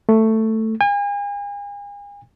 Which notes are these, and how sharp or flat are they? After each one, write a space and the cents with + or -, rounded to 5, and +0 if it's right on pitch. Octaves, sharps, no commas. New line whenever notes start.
A3 +10
G#5 -40